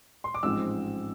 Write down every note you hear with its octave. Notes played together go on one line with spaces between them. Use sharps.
C6
D6
A1 G#2 F3 G#3 C4 E6